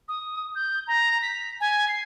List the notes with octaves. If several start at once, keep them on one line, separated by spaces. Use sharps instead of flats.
D#6
G6
A#5
B6
G#5
C7